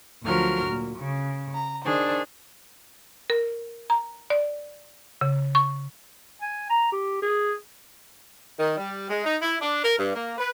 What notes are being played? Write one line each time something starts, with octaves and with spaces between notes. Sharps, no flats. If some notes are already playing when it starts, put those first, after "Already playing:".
D2 F3 F#3 A#4 F6
A#2
C#3
A#5
D#3 D4 G#4 C5
A#4
A#5
D5
C#3
C#6
G#5
A#5
G4
G#4
D#3
G3
G#3
D#4
E4
D4
A#4
G2
A#3
B4